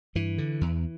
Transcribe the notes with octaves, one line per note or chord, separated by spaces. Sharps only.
G2 E3
D3
E2